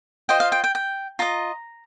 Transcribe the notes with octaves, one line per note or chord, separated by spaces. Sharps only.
F4 C5 D#5 G5
F5
G5
G5
G5
F4 D#5 A#5